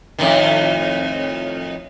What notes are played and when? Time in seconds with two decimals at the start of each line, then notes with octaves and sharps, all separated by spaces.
0.18 F2 A2 D#3